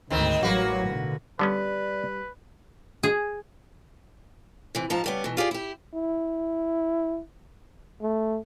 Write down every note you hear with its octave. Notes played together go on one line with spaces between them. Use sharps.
D2 G#2 D#3 B3 C4
A1 F#3 G3 A#3 F#4 B4
B2 D3
D3 G3 B3 C#4 B4 D5
G#4
C3 E3
G#2 F3 A5 A#5
C#3 G3 B3
B2 E3
F4 G4 G#4 D5
E4 G4
E4
A3